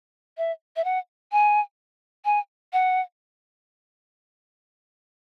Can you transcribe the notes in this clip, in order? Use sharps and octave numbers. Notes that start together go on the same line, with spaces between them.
E5
E5
F#5
G#5
G#5
F#5